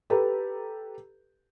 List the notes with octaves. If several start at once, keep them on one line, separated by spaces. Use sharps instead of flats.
G4 A4 B4 A#5